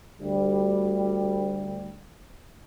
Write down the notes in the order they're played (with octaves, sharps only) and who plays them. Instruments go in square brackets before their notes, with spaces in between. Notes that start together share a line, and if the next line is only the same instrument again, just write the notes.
[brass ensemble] D2 G3